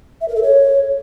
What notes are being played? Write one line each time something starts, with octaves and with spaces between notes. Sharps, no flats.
E5
A#4
A4
C#5